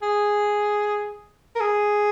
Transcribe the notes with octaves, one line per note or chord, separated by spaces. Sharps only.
G#4
A#4
G#4